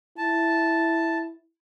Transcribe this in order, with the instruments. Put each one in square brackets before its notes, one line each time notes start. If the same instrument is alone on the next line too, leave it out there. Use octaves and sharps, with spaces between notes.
[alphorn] E4 [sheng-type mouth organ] A5